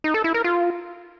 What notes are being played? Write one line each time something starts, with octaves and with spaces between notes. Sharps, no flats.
D#4
A4
E4
A#4
F4